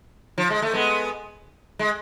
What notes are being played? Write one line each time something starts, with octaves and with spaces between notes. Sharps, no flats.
F3
G#3
A3
G#3 B3
G#3